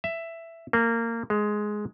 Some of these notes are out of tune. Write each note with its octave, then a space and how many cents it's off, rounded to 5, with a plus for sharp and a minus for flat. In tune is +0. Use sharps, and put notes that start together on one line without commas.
E5 +10
A#3 -20
G#3 +10